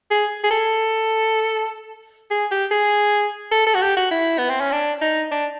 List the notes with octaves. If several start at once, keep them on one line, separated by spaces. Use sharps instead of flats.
G#4
G#4
A4
G#4
G4
G#4
A4
A4
F#4
G4
F#4
E4
B3
C4
C#4
D4
D#4
D4